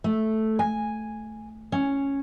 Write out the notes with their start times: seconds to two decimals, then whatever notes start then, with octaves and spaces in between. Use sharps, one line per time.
0.04 A3
0.59 G#5
1.72 C#4